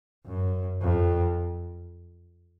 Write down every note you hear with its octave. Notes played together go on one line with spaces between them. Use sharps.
F#2
F2